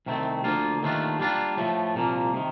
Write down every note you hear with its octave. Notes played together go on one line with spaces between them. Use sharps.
C2 C3 D#3 A3 C4
D2 D3 F3 A#3 F4
D#2 D#3 A3 D4 F4
G3 A#3 D4 F4
A2 F3 A3
C2 A#2 F3 A#3
C3 D#3